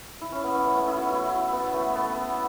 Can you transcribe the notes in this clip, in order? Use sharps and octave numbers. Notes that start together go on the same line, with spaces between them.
E4
C#4
B3
C#4
A3
B3
E4
F#4
E4
B3
A3
B3